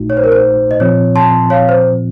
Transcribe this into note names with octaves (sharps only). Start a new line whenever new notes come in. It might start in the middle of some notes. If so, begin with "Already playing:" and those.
Already playing: A#1 A#2 A3 D#4 F#4
C#5
C5
A#4
C5
D#5
A#2 F3 C4 F4 C#5
A5 C6
C#5 F5
C5